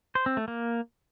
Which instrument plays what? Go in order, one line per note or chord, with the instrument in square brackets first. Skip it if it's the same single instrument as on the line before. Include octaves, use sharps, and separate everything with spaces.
[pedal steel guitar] C5
C4
A3
A#3